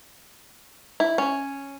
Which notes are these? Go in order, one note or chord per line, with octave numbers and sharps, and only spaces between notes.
E4
C#4